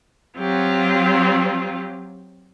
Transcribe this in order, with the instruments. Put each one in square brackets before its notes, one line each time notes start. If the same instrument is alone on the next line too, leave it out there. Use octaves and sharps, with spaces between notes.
[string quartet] F#3 C4 F4 G4